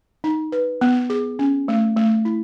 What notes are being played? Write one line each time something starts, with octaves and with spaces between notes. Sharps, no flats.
D#4
B4
B3
G#4
C#4
A3
A3
E4